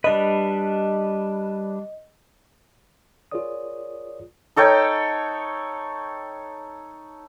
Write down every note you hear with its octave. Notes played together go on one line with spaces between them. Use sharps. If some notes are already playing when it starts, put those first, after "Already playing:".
G3 D4 B4 D#5
F4 G#4 A#4 C#5 D5 D#6
D#4 A4 C#5 G5